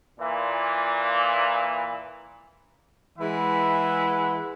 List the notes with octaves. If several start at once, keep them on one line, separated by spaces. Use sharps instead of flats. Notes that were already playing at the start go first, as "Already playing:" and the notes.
A#2 E3
E3 G#3 B4 E5 F#5 B5